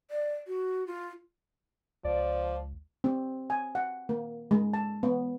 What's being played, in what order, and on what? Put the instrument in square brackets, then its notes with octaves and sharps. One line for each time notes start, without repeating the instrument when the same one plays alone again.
[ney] D5
F#4
F4
[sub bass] C#2 [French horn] F3 [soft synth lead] D5
[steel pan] C4
G#5
F#5
A#3
G#3
A5
B3